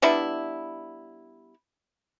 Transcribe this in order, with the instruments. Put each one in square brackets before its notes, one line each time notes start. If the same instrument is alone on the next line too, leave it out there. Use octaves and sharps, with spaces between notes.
[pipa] G3 B3 D4 E4